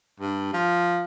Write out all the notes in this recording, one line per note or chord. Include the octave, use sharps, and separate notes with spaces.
G2
F3